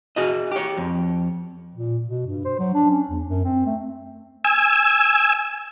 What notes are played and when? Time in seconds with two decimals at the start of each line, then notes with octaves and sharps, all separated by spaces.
0.16 F#4 G#4 D#5
0.52 G4 C#5
0.77 F2
1.75 A#2
2.08 B2
2.26 G2
2.45 C5
2.59 F#3
2.74 D4
2.90 C#4
3.09 E2
3.29 F#2
3.44 C4
3.66 A3
4.44 G#5 E6